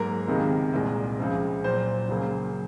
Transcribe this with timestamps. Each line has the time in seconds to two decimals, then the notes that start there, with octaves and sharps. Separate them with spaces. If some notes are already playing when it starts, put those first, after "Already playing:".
Already playing: G#2 F#3 A#3 A#4
0.27 C#2 C3 D#3 G#3
0.73 C2 A#2 G#3
1.19 C#2 C#3 F3
1.64 A#2 F#3 A#3 C5
2.09 C#2 C#3 F#3 A#3